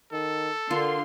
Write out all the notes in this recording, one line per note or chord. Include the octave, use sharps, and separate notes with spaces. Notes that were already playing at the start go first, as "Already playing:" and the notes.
D#3 A4
D3 F4 A#4 C6